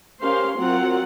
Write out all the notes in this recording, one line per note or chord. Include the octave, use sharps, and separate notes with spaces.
C#4 G4 A#4 C5 F5 C6
F#3 C4 F4 A#4 F#5